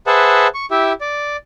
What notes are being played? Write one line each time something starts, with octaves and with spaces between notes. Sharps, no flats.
G#4 B4 C5 E5 F#5 A5
C#6
E4 G4 E5
D5